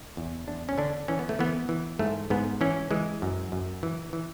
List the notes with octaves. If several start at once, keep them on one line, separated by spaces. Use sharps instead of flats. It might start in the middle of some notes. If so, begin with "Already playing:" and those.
E2
E2 D4
C#4
D3 D4
E3 C#4
B3
A3
E3 B3
E3
G#2 A3
G#2 B3
E3 C#4
E3 G#3
F#2
F#2
E3
E3